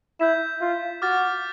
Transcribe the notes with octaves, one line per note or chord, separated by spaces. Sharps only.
E4 G6 B6 E7
F4
F#4 D6 F6 A6